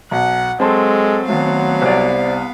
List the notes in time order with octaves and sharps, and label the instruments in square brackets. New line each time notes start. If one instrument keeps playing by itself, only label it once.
[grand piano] B1 [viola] F#5
[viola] F#3 A4 [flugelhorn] G#3 [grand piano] C4 A5 C6
[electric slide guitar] D#3 A3 [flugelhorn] F#3 [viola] B3 F5
[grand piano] C2 [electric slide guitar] C5 D5